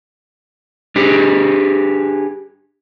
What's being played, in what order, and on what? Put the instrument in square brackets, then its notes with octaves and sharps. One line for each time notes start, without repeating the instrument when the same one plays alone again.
[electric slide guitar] D4 G4 G#4